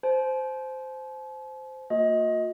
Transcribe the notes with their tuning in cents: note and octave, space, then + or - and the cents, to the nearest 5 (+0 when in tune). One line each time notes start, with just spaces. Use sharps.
C5 -10 A5 -45
A#3 -30 F4 +45 D#5 +20